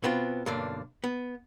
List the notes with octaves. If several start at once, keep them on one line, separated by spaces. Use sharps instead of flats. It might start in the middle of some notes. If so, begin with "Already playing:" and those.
B2 B3 C4 F4
B1 G2 D3 A#3 D4
B3